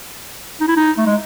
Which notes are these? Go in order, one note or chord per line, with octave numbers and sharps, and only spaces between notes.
D#4
E4
D#4
A3
G#3